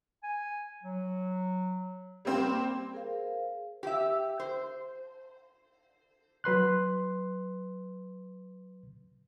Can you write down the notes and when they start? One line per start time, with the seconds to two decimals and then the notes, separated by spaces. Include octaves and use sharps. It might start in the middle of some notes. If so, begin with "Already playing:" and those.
0.23 G#5
0.83 F#3
2.25 G3 A#3 C4
2.94 G#4 A#4 C5 F5
3.83 G4 E5
4.40 C5
6.44 F#3 B4 C6 F#6